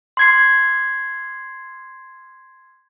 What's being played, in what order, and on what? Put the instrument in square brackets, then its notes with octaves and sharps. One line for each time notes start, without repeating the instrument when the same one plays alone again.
[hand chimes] C6 G#6 C7